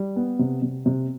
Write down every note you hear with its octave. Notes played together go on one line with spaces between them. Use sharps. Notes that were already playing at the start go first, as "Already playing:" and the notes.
Already playing: G3
B3
C3
C3
C3